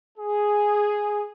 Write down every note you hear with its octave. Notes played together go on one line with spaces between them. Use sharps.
G#4